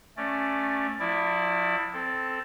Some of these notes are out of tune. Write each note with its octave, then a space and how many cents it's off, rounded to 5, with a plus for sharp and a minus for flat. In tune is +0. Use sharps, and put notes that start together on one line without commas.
A3 +0 C#4 +0 D5 +5
F3 +40 E4 +0 D5 +15
C4 -5 A4 +0